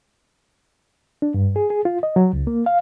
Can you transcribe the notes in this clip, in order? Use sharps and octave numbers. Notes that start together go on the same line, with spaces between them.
D4
G2
G#4
G#4
F4
D#5
F#3
C#2
A#3
F5